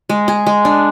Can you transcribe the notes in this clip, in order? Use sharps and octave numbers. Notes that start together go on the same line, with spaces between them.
G#3
G#4
G#3
D4